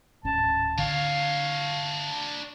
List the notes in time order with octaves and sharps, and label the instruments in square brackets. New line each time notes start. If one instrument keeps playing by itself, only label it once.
[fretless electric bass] D1 G#1 C#4 [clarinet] A5
[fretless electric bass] D3 [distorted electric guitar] D4 C#5 [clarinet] F5